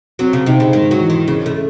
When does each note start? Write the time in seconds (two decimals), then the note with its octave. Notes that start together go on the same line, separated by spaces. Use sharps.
0.19 F#3 C4
0.33 C#3
0.46 C3 D#4
0.60 C#3
0.73 G#2 D#3
0.91 F#3
1.00 E3
1.10 D#3
1.27 C#3 C#4
1.46 A3